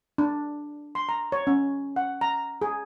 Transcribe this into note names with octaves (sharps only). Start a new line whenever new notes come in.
D4
C6
A#5
C#5
C#4
F#5
A#5
G#4